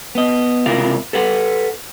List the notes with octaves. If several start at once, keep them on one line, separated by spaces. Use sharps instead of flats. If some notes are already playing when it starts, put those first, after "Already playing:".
B3 D#5
C#2 C3 E4 F4 A#4 F5
A4 B4 F#5